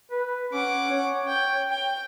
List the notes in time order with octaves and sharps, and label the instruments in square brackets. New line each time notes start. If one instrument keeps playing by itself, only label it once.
[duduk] B4
[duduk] C#4 [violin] F#5 D6
[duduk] C#5
[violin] G5
G5